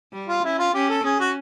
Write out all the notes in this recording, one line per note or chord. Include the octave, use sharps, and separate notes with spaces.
G3
F4
C#4 E4
F4
C#4 G4
A4
C#4 G#4
F#4